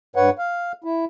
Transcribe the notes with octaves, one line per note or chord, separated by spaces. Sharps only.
G2 B4 C#5 F#5
F5
E4